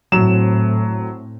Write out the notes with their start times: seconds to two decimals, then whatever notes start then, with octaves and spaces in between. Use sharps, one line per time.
0.12 A2 F#3 C4 E7